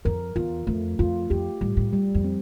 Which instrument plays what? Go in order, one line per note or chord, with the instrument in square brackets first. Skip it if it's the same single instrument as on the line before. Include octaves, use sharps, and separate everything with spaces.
[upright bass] F2 [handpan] A#4
[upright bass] E2 [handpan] F4
[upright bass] F2 [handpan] A3
[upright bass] F2 [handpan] F4
[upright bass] F2 [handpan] G4
[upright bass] A2 [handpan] G3
[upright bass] A2
[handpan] G3
[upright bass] F2
[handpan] C4